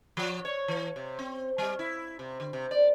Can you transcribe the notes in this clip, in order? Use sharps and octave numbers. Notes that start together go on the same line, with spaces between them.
F3
C#5
E3
C3
C4
G3
E4
C3
D3
C3
D5